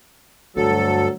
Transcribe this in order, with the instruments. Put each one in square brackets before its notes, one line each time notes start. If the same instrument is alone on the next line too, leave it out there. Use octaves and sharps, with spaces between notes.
[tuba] D2 [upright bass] G2 [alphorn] F#3 [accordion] A4